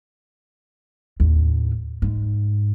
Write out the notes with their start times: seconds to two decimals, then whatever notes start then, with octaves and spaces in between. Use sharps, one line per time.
1.20 D#2 A2
2.02 G#2